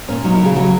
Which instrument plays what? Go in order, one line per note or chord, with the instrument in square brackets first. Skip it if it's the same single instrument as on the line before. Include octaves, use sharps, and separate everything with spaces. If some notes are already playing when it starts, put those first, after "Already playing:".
[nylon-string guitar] A#2 C#4
F#3 D#4
E4
C#3 F#4
G#4
F#3 F#4